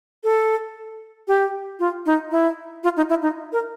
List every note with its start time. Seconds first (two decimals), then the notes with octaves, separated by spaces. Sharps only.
0.24 A4
1.28 G4
1.79 F4
2.06 D#4
2.31 E4
2.84 F4
2.97 D#4
3.09 E4
3.22 D#4
3.53 A#4